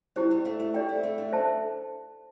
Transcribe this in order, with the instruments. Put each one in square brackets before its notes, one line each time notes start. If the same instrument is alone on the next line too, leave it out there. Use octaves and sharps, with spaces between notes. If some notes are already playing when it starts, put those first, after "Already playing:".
[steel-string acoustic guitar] G3 C4 [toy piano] E4 G4 C5
[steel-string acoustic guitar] G3 C4
A3 D4
A3 D4
[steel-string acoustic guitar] A3 D4 [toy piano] G4 D5 G5
[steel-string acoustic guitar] C4 E4
A3 D4
A3 D4
[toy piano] C5 E5 A5